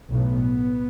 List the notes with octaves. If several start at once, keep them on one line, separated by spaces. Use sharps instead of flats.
B1 A2 B3